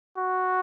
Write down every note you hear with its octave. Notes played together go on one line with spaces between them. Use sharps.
F#4